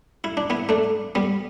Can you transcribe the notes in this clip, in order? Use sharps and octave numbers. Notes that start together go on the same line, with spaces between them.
E4
D4
B3 E4
A3 D4
G3 B3